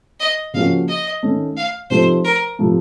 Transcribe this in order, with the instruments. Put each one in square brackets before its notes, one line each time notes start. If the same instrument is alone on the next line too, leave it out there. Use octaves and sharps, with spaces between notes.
[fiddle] D#5
[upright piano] C#3 F3 A#3 C#4 F#4 [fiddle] F5
[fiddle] D#5
[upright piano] D#3 A3 C#4
[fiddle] F5
[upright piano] C3 F3 A3 D#4 A4 [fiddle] C5
[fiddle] A#4
[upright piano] C3 F3 A3